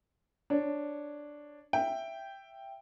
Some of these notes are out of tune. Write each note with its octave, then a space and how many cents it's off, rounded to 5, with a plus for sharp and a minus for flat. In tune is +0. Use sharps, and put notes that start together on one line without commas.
D4 +0 C#5 +0
E5 +10 G5 +0